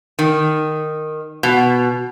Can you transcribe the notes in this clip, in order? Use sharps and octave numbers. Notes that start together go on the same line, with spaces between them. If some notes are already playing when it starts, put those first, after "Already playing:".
D#3
B2